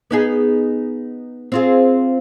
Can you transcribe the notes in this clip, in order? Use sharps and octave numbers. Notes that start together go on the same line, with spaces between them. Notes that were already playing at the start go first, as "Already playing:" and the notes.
B3 D#4 G#4
C4 F4 G#4